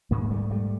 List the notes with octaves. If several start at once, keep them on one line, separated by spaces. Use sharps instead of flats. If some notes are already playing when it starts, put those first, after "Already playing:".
G#2 G#3 A#3
G3 A3
G3 A3